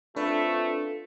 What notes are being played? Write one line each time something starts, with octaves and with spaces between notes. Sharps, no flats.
A3 C4 D4 F4 A4 B4